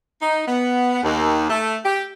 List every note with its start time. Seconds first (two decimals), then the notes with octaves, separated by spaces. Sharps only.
0.22 D#4
0.48 B3
1.04 D#2
1.50 A3
1.85 G4